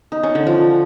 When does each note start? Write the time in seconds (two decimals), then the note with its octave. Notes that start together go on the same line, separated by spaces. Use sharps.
0.12 D#4
0.23 C#4
0.35 D3
0.47 F3